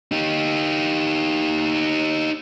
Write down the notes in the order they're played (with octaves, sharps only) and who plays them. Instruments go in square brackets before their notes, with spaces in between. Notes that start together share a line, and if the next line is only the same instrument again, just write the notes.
[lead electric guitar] D#4 G4